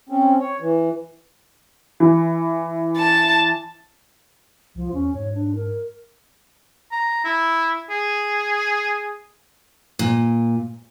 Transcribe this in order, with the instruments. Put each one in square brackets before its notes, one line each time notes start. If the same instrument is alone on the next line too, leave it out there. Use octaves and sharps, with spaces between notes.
[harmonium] C4 C#4
C#5
E3
[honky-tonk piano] E3
[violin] A5
[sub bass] C2 [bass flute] F3
[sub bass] E2 [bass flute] C#4
[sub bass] G#2 [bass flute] C#5
[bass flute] D4
A#4
[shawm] A#5
E4
G#4
[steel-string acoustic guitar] A#2